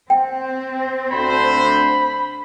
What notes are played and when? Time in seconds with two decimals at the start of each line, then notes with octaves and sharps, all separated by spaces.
0.10 C4 G5
1.11 D2 D3 C5 B5